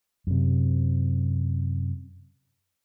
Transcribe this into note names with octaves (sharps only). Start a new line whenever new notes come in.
F#2 C3